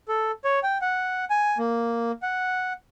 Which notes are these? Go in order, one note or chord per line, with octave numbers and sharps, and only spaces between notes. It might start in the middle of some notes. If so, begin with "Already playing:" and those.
A4
C#5
G5
F#5
G#5
A#3
F#5